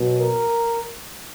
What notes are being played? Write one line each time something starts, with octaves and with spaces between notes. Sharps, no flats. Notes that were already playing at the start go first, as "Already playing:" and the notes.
Already playing: B2 F#3
A#4